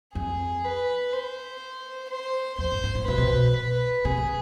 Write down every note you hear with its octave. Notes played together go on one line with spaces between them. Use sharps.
F2 G#4
B4
C5
C5
F2 C5
G#2
G#2
A2
B2 B4
C3
B2
B4
C3 G#4
D3